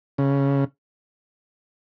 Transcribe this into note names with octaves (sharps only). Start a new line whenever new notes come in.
C#3